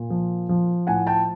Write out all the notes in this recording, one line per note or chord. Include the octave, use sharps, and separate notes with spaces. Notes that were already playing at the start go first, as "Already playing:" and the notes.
Already playing: A#2
F3
F3
A2 F#5 G#5
G5 A5